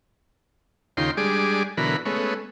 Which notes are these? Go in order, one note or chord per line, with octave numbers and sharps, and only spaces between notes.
D#2 C#3 D#4 F4 G5 C6
G3 G#3 D4 G#4 D6
B2 D3 E3 F#3 A#4 B5
G#3 A3 B3 C#4